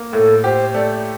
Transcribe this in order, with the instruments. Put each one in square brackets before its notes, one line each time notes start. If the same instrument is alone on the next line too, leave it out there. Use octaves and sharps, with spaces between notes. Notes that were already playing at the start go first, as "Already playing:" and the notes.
Already playing: [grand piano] A#3
[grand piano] A2 [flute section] A4
[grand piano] G4 [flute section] C5
[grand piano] A3 [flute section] D5